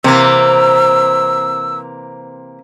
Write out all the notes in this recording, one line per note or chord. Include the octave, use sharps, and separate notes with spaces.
C3 E3 A#3 C4 E6